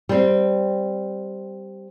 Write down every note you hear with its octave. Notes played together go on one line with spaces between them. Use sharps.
G3 C4